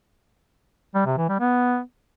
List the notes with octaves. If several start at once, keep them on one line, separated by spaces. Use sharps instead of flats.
G3
C3
E3
G3
B3